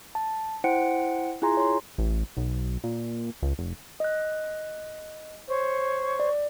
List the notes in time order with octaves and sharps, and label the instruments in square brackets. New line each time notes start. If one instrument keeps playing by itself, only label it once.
[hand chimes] A5
E4 C5 F#5 G5 C#7 D7
E4 F4 G#4 G#5 A#5 C6
C#5 C6
[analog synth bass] A1
B1
A#2
C#2
F1
[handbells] D#5 F#6
[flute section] C5 C#5 C#6
[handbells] D5